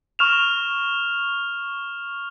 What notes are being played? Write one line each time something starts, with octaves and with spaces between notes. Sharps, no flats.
C#6 F6 E7 F7